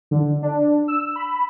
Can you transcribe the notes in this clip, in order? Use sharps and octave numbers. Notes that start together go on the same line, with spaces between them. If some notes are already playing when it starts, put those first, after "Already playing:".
D3
D4
E6
B5